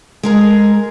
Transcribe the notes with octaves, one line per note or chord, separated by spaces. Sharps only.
G#3 G#4 A#4